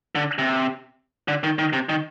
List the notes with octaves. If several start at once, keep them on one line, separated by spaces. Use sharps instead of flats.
D3
C3
D3
D#3
D#3
C3
D#3